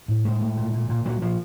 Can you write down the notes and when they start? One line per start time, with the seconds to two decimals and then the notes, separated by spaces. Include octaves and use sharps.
0.08 A2
0.25 A2 G#3
0.41 A2
0.57 A#2
0.74 A#2
0.89 A#2
1.05 A#2 F#3
1.21 A#2 F3